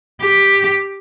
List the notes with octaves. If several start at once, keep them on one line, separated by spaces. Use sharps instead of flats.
G4